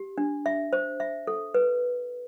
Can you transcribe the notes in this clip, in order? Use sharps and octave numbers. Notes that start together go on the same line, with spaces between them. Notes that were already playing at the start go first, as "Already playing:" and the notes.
Already playing: G4
D4
E5
C5
E5
A4
B4